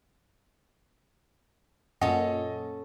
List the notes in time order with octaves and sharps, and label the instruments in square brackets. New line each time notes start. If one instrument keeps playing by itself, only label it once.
[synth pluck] F#2 A#2 [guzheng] C#4 A4 [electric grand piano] D#5 [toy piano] F#5